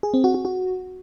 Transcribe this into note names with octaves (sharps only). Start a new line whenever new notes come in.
G#4
C4
F#4
F#4
F#4